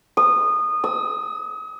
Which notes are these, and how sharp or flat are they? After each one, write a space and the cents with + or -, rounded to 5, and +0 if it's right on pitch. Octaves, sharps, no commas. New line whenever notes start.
D#6 -20
D#6 +40